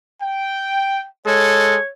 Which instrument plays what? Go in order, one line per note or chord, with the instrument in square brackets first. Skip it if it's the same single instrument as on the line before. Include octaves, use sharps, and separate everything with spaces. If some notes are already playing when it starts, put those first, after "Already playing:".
[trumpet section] G5
[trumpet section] G#3 A4 [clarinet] C#5